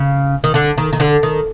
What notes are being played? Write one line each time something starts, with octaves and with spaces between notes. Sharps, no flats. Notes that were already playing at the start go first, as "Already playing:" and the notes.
Already playing: C#3
D#3
D3
D#3
D#3
D3
D#3